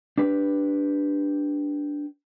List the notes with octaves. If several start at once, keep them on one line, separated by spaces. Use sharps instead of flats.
D4 G4 B4